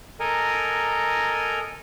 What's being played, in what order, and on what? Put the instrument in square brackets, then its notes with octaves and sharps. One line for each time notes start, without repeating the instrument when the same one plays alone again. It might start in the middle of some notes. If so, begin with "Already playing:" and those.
[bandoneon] A4 A#4 D#5 G#5 A#5